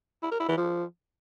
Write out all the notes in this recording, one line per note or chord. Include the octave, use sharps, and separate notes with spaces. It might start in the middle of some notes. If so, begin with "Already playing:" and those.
E4
A#4
E4
E3
F3